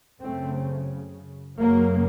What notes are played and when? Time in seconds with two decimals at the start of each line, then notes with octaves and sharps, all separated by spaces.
0.22 F#2 C#3 A3 C4
1.59 F#2 C#3 F#3 A#3